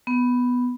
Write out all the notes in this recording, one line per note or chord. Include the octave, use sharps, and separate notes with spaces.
B3